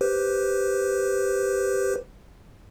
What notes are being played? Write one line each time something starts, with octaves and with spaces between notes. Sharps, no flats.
G4 B4 C5